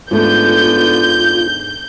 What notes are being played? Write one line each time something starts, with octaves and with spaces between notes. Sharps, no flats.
G#2 D3 A3 B3 F4 G6